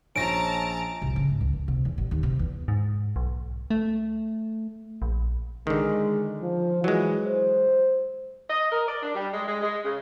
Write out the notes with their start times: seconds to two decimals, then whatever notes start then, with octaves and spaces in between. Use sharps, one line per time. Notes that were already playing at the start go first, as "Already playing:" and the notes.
0.16 A#1 C#4 A5 A#5 A#6 D7
1.02 C2
1.16 C#3
1.29 G#2
1.41 C#2
1.53 F#2
1.68 C3
1.85 E2
1.98 A1
2.11 D#2
2.23 C3
2.39 E2
2.68 G#2
3.16 B1
3.70 A3
5.02 A#1
5.67 D3 D#3 G#3
6.42 F3
6.84 E3 F#3 G#3
7.26 C5
8.50 D#5
8.72 A#4
8.88 D5
9.03 D4
9.15 G3
9.34 G#3
9.48 G#3
9.62 G#3
9.85 C#3